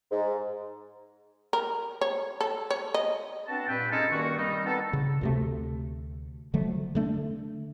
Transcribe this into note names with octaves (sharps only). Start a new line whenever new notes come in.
G#2
A#4
C#5
A4
C#5
D#5
B3 C4 D4 F#4 A5
G2 A#2 C4 B4 G5
G#3 C#4 D#4 F4 G#4 A4
G2 D#3 A#3 F#4
D#3 G3 C4 D#4
B3 C4 D#4 A4
C#3
D2 C3 A3
D3 F3 F#3 A3
D3 A3 D4